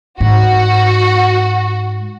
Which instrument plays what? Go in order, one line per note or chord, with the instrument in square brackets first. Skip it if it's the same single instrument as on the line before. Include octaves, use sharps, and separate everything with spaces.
[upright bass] G#2 [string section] F#4